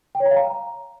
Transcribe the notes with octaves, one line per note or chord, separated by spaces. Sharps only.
G5
C#5
A#5
F5
A#5